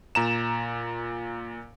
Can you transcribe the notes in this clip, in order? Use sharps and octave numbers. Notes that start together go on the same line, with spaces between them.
A#2 A#5 E7